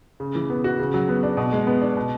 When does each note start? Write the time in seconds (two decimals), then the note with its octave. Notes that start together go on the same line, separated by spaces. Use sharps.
0.20 C#3
0.35 E3
0.50 B3
0.64 F#4
0.79 C#3
0.94 F#3
1.09 B3
1.23 D4
1.37 B2
1.52 G#3
1.67 B3
1.82 D4
1.97 B2